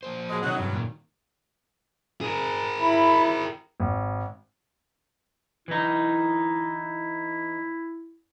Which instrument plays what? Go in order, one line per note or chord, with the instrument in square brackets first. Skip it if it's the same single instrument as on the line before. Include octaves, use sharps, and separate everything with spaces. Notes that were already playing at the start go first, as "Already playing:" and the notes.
[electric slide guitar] F3 A#3 C5
[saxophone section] B2 F#3 G#3
[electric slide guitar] C3 D#3 [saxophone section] F#3 [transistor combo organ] D#4 F#5
[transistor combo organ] G2
[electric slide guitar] A#2 D#3
[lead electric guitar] G#4 A#4
[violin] E4 [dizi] B5
[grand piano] G#1
[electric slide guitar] E3 D#4 [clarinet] E4